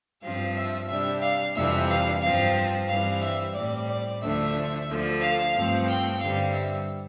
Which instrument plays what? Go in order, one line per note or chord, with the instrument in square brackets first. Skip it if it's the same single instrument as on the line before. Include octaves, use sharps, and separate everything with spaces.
[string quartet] G2 F3 C4 F5
E5
C3 G3 D4 E5
F5
F2 C3 E3 G3 D4 E5
F5
G2 F3 C4 F5
G2 E3 G3 C4 F5
E5
A2 G3 C4 D5
D5
D2 D3 F3 A3 D4 E5
D2 D3 F3
F5
G2 F3 A3 C4
G5
G2 D3 G3 C4 F5
E5